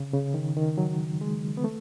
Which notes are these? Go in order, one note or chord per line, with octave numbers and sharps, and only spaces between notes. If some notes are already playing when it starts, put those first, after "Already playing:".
Already playing: C#3
C#3
D#3
D#3
F#3
G#3
B3
A3